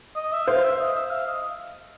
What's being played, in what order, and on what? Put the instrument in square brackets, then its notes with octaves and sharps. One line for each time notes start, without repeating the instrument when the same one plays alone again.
[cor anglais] D#5
E5
[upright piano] C5 [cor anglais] F5
[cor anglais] E5
D#5
E5
F5
D#5